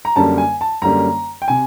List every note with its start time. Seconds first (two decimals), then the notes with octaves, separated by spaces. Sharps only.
0.05 A#5
0.16 F#2 D3 G3 A#3 C#4 A5
0.38 G#5
0.61 A5
0.82 F#2 D3 G3 A#3 C#4 A#5
1.42 G5
1.48 C3 G#5